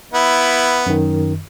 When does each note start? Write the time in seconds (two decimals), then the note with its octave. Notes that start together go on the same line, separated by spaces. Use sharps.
0.13 B3 E4
0.86 F#2 D#3